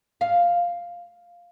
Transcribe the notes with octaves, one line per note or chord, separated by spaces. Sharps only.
F5